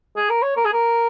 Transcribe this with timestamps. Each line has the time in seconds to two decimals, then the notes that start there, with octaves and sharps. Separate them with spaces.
0.16 G#4
0.29 A#4
0.42 C#5
0.57 A#4
0.65 G#4
0.73 A#4